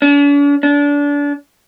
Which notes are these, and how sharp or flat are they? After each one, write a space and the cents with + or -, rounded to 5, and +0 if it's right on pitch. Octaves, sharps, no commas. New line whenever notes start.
D4 -45
D4 -30